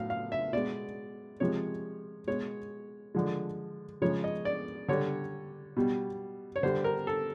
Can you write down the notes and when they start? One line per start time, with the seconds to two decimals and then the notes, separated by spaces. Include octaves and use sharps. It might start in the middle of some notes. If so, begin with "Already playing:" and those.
Already playing: A2 F#3 F5
0.10 F5
0.32 E5
0.53 B2 G#3 D5
1.40 C3 F3 G#3 C#5
2.27 B2 G#3 C#5
3.15 D3 F3 G#3
4.02 C#3 F3 G#3 C#5
4.24 D#5
4.45 D5
4.88 D3 G3 C#5
5.77 B2 G3
6.56 C#5
6.63 D3 G3 C5
6.84 A#4
7.07 A4